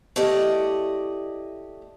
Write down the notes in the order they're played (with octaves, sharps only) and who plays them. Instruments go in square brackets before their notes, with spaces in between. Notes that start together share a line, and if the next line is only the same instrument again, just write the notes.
[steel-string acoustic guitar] A3 E4 G4 D5 D#5